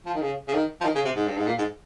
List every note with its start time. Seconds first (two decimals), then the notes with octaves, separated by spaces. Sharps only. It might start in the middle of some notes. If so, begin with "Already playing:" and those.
0.06 F3
0.15 D#3
0.22 C#3
0.48 C#3
0.54 D#3
0.81 F3
0.85 D#3
0.95 C#3
1.05 C3
1.16 G#2
1.28 G2
1.38 G#2
1.47 A#2
1.58 G#2